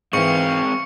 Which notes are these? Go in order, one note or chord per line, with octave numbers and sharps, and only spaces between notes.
G#2 E3 G#3 C4 F5 C#6 C#7